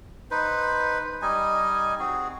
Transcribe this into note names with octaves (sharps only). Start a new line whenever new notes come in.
D#4 B4 C5
G3 D#4 D#5 G#5
C4 F#4 G#4